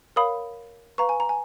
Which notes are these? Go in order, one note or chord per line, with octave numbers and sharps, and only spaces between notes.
A#4 C#5 F5 B5 D#6
B4 F5 A#5 C#6
G#5
A#5
G#5